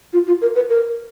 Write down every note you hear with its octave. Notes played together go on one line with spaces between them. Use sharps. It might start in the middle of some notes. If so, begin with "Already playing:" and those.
F4
F4
A#4
B4
A#4